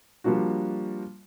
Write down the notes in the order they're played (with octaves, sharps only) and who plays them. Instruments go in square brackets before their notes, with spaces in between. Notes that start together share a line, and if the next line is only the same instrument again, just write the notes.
[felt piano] F3 G3 A#3 D4 F#4